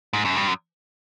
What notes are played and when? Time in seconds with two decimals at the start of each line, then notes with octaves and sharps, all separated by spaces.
0.13 G#2
0.25 F#2
0.36 G2
0.47 F#2